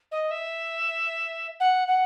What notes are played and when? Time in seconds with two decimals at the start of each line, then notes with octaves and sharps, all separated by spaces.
0.11 D#5
0.30 E5
1.60 F#5
1.87 F#5